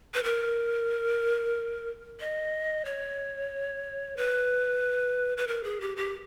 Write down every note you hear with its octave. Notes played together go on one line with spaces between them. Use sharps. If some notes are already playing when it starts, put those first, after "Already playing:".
B4
A#4
D#5
C#5
B4
B4
A#4
G#4
G4
G4